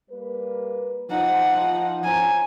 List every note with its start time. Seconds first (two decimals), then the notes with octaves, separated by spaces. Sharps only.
0.10 G3 A#3 B4
1.10 F3 D#4 F#5
2.04 C#4 C5 G#5 A#5